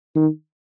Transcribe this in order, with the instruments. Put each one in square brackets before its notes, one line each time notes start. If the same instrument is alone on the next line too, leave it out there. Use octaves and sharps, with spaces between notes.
[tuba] D#3